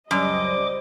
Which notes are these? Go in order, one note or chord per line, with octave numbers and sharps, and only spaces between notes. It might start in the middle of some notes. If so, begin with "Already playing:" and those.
C#2 F#2 G3 C5 D5 D#5 D6